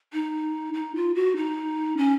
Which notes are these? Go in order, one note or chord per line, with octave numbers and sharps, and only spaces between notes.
D#4
D#4
F4
F#4
D#4
C#4